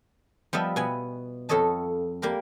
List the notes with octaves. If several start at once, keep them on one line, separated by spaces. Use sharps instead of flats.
F3 G3 B3 D#5 E5
B2 B3 G#5
F2 A4 C#5 D#5 A5
G3 A#3 G4 A#4